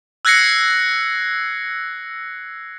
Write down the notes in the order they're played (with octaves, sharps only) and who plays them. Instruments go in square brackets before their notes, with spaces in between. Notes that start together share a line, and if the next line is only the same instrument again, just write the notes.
[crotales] E6 F#6 G#6 A#6 C7 C#7